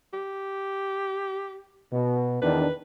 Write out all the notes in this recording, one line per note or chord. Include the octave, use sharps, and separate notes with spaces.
G4
B2
E2 D#3 D4 B4